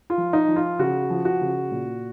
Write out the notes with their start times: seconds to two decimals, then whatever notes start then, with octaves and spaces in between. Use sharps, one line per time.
0.10 F4
0.18 F3
0.33 D#4
0.48 F3
0.56 F4
0.79 C#3 F#4
1.10 F3
1.25 F#4
1.41 C#3
1.71 A#2